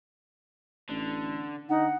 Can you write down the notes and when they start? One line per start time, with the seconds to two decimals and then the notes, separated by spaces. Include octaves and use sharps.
0.89 A1 D3
1.69 D3 D#4 F#5